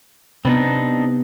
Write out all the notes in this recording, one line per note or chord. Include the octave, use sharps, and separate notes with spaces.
C3 B3 C4 D4 D#4